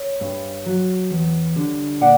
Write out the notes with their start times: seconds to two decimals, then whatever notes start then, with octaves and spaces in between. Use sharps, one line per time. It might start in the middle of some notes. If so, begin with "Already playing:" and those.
Already playing: C#5
0.21 G2
0.66 F#3
1.11 E2
1.56 D3 G3
2.01 A#2 D5 F#5